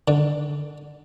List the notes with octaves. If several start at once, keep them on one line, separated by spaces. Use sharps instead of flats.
D3